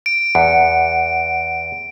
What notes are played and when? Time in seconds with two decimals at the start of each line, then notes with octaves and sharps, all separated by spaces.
0.06 D7
0.35 E2 F#5